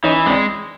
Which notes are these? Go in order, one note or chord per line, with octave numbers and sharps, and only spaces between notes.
E3 C#4 D#4
G#3 C4 D4